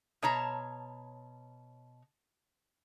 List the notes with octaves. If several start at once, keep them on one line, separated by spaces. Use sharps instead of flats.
B2 C#5 A5 A#5